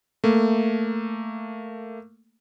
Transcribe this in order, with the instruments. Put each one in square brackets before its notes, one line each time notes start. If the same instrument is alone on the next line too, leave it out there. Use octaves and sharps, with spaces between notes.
[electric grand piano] A3 A#3